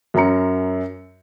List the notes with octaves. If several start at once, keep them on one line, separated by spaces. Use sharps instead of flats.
F#2 F#3 C#4 A#5 C#7